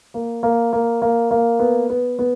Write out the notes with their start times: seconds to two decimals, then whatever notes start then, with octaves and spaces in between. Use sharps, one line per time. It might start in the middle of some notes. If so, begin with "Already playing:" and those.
0.14 A#3
0.43 A#3
0.73 A#3
1.02 A#3
1.31 A#3
1.59 B3
1.90 B3
2.19 B3